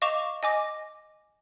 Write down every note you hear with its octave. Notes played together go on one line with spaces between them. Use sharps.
D#5 F5 C#6 D6 E7 F7
D#5 G#5 D6 A#6